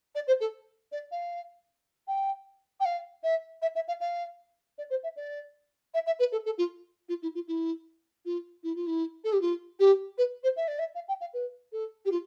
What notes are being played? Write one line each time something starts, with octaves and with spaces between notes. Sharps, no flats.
D5
C5
A4
D5
F5
G5
G5
F5
E5
E5
E5
F5
F5
D5
C5
E5
D5
E5
E5
B4
A4
A4
F4
F4
E4
F4
E4
F4
E4
F4
E4
A4
G4
F4
G4
B4
C5
E5
D5
E5
F5
G5
F5
B4
A4
G4
F4